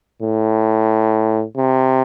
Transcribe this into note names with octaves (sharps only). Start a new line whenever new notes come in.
A2
C3